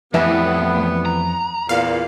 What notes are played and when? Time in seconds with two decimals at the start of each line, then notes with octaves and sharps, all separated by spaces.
0.14 F2 A2 E3 G3 B3 E5 G#5
1.05 A#5
1.69 E2 A#2 F5